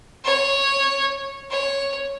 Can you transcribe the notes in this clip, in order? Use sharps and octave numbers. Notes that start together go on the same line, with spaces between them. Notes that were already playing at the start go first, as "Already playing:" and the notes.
C#5
C#5